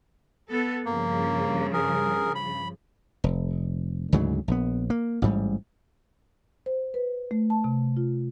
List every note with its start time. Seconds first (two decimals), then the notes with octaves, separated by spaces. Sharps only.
0.50 B3 A4
0.86 G2 C#3 F3 A#3
1.73 G#4 A#4
2.35 B5
3.24 F1
4.13 D2 G#2 C#3 F#3
4.48 A#1 B3
4.90 A#3
5.22 A1 G#2 G3
6.66 C5
6.94 B4
7.31 A3
7.50 A5
7.64 C3
7.97 F4